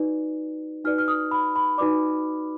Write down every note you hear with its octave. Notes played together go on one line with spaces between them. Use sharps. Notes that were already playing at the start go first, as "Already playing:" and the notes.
Already playing: D#4 F#4 B4 D5
D#4 F#4 B4 D5 F6
F6
D#6
B5
B5
D#4 F#4 B4 D5 D6